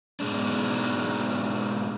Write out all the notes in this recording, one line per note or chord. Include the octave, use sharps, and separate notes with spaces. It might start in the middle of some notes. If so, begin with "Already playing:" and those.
G#2 B2 G#3 D4